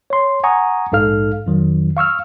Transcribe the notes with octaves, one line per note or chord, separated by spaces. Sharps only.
C#5 C6
F#5 G#5 A#5 C#6 D#6
A#1 G#2 D#4 A4 F5 F6
F2 D#3 F#3
F5 C#6 E6 F6